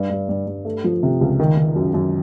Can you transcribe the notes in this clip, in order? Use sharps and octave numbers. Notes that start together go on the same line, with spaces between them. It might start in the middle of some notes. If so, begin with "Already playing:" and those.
Already playing: G2
G2
G2
G2
A3
F3
C3
C#2
D#3
D#3
F#2
F#2